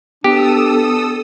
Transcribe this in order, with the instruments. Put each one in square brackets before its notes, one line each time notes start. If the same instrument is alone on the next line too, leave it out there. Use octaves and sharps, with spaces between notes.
[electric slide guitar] B3 [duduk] D4 [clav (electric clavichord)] G4 [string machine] A4 D#6 E6